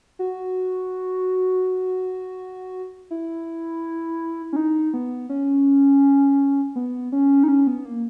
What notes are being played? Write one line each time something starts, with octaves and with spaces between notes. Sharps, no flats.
F#4
E4
C#4
D#4
B3
C#4
B3
C#4
D#4
C#4
B3
A#3